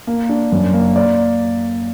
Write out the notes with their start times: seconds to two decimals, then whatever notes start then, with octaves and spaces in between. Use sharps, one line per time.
0.07 A#3
0.29 D4
0.52 F#2
0.74 A#3
0.96 D5